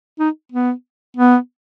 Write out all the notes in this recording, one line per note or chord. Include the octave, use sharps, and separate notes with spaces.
D#4
B3
B3